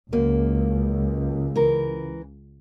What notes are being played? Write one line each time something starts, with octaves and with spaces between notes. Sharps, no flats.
C#2 F#2 A#3
E3 A#4